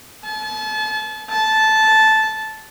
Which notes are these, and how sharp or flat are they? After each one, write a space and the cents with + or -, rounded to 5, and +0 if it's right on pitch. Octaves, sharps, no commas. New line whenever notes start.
A5 -35
A5 -10